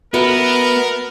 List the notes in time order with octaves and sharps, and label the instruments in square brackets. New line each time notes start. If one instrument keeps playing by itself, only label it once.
[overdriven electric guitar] B3 [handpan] F#4 [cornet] A#4 [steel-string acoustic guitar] B4 E5